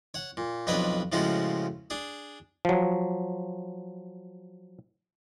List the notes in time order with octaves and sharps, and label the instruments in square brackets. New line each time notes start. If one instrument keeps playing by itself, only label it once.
[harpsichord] C#5 F#5
A#2
B1 F2 D4 B4 C#5 D#5
A2 C#3 F3 G#3 F4 F#4
D4 G#4
[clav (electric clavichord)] F3 F#3